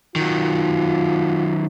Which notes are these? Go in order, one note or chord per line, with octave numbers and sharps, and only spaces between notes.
D#3 F#3 F4